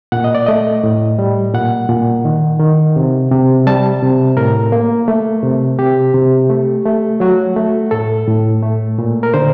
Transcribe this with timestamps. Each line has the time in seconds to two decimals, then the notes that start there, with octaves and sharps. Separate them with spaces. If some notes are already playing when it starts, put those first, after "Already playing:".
0.12 A#2 F#5
0.24 D#5
0.35 D5
0.46 A3 D#5
0.84 A2
1.19 G3
1.54 A#2 F#5
1.89 A#2
2.25 D#3
2.60 D#3
2.96 C3
3.32 C3
3.67 G3 A5
4.03 C3
4.37 A2 A#4
4.72 A#3
5.08 A3
5.43 C3
5.79 C3 G4
6.14 C3
6.49 A3
6.86 A3
7.20 F#3 F#4
7.56 A3
7.91 A2 A4
8.27 A2
8.63 A3
8.98 A#2
9.23 A#4
9.34 D3 C5